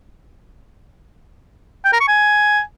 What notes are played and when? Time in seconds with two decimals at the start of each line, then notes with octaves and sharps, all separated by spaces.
1.84 G5
1.92 A#4
2.00 C#6
2.08 G#5